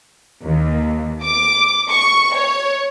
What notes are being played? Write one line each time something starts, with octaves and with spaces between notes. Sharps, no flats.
D#2
D6
C#6
C#5